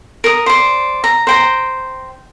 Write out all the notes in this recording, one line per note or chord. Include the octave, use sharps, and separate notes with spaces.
A#4 D#6
C5 D5
A#5
C5 G5 A#5